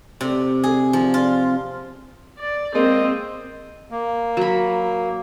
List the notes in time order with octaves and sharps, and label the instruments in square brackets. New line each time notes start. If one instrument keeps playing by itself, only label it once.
[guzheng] C3
G#4
F3
F4
[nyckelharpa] D5
[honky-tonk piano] G#3 A#3 [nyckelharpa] C4 [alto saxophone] D#5
[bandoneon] A#3
[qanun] F#3 B5